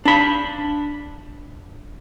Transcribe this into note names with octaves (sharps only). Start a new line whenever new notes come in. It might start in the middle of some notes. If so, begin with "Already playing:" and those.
D4 B5